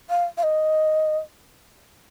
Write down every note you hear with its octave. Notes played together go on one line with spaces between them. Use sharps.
F5
F5
D#5